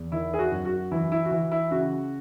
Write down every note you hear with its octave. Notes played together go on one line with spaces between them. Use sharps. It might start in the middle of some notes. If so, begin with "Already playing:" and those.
Already playing: E2
D#3 E4
G#4
F#4
F#2
F#4
E3 E4
E4
F#4
E3 E4
E4
C#3 F#4